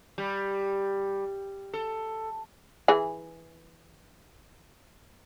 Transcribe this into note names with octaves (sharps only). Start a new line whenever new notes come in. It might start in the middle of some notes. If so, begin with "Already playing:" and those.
G3
A4
E3 G#4